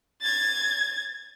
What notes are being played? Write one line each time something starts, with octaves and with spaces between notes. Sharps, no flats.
G#6 A6